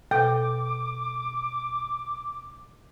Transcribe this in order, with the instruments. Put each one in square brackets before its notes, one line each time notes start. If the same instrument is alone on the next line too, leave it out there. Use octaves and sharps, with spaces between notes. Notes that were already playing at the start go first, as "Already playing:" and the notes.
[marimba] B2 A4 [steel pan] G5 [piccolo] D6